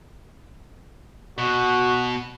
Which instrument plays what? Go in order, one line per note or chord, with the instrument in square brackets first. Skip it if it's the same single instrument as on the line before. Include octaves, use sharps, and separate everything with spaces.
[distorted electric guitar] B2 [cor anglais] F#4